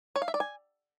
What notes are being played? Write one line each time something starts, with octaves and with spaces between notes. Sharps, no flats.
C#5
F5
E5
D5
G#5